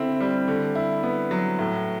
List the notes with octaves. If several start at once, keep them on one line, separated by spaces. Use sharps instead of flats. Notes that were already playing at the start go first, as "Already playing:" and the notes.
Already playing: D3 C4 E4
G3
D3
E4
B3
F#3
A2